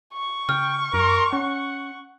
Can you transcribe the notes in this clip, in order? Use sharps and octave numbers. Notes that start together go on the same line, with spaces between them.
C#6
C#3 G5 F6
F#2 A#4
C#4 F#5